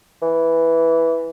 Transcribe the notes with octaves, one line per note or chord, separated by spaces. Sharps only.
E3